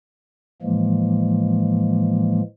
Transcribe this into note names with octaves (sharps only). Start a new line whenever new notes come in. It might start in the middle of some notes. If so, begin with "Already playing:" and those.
A2 E3 F3 G#3 A#3